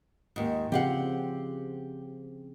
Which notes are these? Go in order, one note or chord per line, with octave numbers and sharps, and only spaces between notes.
D#2 G#2
C#3 F3 C4 G4 F5 F#5